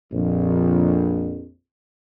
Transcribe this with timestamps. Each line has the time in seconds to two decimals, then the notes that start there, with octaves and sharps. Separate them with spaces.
0.12 A#1 F2